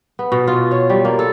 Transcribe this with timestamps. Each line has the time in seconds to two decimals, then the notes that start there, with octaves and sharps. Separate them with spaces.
0.19 B3
0.32 B2
0.47 F4
0.71 C#5
0.90 G3
1.05 A#3
1.19 A4